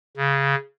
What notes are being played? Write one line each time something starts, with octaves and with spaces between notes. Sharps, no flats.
C#3